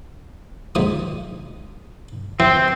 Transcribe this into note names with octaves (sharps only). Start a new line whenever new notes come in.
A#1 G#2 D#6
E3 C4